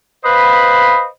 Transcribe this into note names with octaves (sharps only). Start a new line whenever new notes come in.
B4 C5 D#5 F5 B5